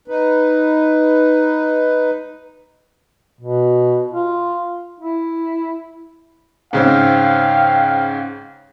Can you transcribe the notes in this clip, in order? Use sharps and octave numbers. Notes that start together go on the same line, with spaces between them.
D#4 B4
B2
F4
E4
G#2 C#3 C4 F5 G5